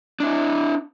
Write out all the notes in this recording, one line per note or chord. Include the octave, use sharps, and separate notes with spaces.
D4 E4